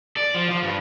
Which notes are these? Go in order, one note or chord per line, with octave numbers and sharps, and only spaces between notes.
D5
F3
F3
G2